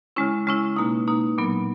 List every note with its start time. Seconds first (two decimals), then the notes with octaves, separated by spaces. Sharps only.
0.16 C#3 G#3 C#4 E4
0.47 C#3 G#3 C#4 E4
0.76 B2 A#3 D#4
1.07 B2 A#3 D#4
1.38 A#2 F#3 B3